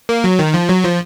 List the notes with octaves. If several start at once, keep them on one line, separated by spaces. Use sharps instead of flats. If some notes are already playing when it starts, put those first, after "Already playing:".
A#3
F#3
D#3
F3
F#3
F3